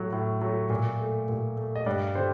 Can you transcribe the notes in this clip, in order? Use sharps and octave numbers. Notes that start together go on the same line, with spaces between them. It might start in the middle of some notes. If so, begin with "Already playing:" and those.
Already playing: A2 F#3 A3
A2
F#3 A3
A#2
A3
A#2
A3
D#5
G2 D5
D3 G3 C5